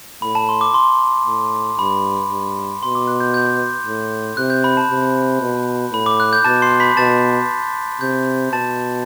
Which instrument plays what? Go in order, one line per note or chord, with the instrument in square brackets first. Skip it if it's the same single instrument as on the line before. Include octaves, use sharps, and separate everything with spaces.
[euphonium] A2 [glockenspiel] B5
[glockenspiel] A5
C6
D6
C6
[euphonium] A2
[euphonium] G2 [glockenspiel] B5
[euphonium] G2
[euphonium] B2 [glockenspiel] C6
[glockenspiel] D6
F#6
G6
G6
[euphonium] A2
[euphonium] C3 [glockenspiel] F#6
[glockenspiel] G6
B5
A5
[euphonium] C3
B2
[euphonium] A2 [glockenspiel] B5
[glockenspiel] D6
F#6
G6
[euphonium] B2 [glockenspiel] A5 A6
[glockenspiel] C6 C7
B5 B6
[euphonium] B2 [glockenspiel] A5 A6
[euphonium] C3 [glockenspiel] G6
[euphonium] B2 [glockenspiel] A5 A6